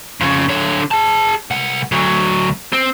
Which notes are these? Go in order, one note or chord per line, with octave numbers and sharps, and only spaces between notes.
F2 C#3
D3 C#5
G#4 A5
C2 F#5
D2 F#3
C4